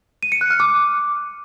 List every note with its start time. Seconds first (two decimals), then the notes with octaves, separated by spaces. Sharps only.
0.23 D#7
0.32 C#7
0.41 F#6
0.50 F6
0.60 D6